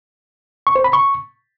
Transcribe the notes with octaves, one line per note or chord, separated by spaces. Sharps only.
C#6
C5
B5
C#6